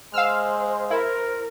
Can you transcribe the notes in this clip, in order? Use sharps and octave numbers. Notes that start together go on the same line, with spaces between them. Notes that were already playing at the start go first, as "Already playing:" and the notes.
G#3 C5 F5 E6 F6
E4 A#4